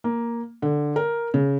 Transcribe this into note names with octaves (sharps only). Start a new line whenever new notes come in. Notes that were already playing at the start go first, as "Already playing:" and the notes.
A#3
D3
A#4
C#3